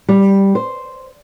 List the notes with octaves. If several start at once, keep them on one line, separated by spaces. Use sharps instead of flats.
G3
C5